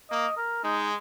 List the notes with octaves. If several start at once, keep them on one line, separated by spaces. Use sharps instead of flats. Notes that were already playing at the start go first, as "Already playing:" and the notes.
A#3 D#5
A#4
G#3 D#4